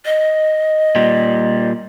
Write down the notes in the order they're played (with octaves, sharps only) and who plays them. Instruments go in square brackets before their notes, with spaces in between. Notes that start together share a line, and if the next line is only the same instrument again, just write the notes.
[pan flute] D#5
[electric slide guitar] A#2 G3